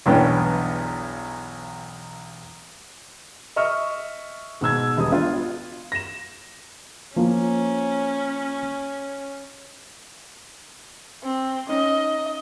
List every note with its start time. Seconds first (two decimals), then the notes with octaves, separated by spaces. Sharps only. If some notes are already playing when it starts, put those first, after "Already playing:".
0.06 B1 E2 G2 B3 C#4 G5
3.56 D#5 E5 C#6 F6
4.61 G#2 B2 E6 G#6
4.97 E1 G3 D#6
5.11 B3 D4 F4
5.34 F4
5.92 A#6 E7
7.16 F3 A#3 C#4
11.23 C4
11.69 C#4 D#4 D#5